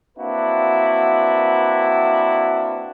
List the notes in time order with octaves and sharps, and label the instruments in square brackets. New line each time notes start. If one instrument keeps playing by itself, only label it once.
[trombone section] A#3 C4 D4 E4 F#4 B4